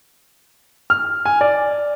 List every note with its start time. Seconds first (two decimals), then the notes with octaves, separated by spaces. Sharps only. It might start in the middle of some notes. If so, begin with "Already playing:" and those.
0.90 F6
1.26 G#5
1.41 D5